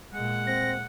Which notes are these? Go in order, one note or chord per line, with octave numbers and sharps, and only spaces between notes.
A#2 G#3 F#5
C4 A#6